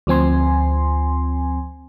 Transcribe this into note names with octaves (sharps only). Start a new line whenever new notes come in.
D2 F3 C4 G#5 C6